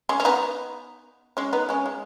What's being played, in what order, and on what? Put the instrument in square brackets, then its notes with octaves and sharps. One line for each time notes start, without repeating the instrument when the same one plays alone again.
[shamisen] G#3 C#4
C#4
B3 D#4
G#3 C#4
B3 D#4
G#3 C#4
G#3